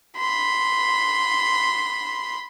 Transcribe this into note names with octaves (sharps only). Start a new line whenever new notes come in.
B5 C6